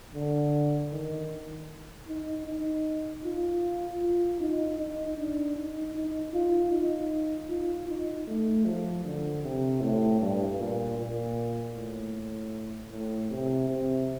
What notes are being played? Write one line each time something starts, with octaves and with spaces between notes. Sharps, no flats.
D3
D#3
D#4
D#4
F4
F4
D#4
D#4
D4
D#4
D#4
F4
D#4
F4
D#4
A3
F3
D3
C3
A2
G2
A#2
A#2
A2
A2
C3
C3